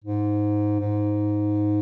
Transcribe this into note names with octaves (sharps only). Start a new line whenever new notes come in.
G#2
G#2